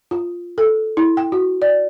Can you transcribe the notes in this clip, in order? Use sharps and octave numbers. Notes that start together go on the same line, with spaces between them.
F4
A4
E4
G5
F#4
D5